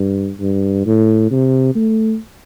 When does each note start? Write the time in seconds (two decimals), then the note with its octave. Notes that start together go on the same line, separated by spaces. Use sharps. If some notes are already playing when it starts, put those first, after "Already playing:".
Already playing: G2
0.40 G2
0.86 A2
1.31 C3
1.75 A3